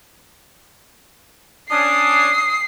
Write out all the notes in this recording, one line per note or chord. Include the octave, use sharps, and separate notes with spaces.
C#4 D4 D#6 C7